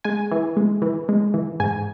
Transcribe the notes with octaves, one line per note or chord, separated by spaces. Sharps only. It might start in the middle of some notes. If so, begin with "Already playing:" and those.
G#3 G#5
E3
G#3
E3
G#3
E3
G#2 G#5